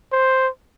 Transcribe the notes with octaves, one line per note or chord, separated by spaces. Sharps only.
C5